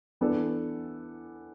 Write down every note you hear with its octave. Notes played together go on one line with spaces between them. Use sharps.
E3 B3 D4 A4